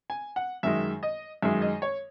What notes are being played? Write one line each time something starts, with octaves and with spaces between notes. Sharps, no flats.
G#5
F#5
F#2 D#3 G#3 E5
D#5
F#2 D#3 G#3 E5
D#5
C#5